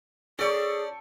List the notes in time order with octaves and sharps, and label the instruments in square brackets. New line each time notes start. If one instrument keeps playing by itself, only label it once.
[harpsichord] C#4 D5 [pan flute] G#4 [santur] A4 G5 C#6